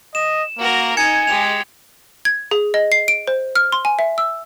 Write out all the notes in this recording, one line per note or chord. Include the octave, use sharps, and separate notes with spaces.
D#5 E7
A#3 F#4 A#4
D#4 G#5 G#6 C#7 E7
G#3 G4 F7
G#6
G#4
D#5
C7
D7
C5
F6
C6
G#5
E5
E6